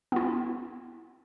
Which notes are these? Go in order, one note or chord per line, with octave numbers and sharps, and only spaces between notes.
B3 E4